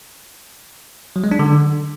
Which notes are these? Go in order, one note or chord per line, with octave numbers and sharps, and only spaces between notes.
F#3
G#3
D4
D3